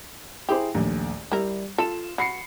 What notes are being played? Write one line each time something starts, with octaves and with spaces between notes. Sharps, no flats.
E4 G4 G#4 C5
A#1 D#2 A3
G3 E4 A#4
F4 A4 E7
F#4 B5 C7 C#7